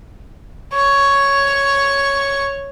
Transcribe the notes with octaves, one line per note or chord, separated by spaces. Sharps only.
C#5 C#6